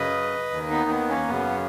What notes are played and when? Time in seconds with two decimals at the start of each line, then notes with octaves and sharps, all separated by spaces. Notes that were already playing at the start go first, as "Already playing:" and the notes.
Already playing: F#2 C#3 B4 D#5
0.51 D#2 D#3
0.70 B3 D#4
0.90 B3
1.09 A#3 C#4
1.29 F#2 C#3 B3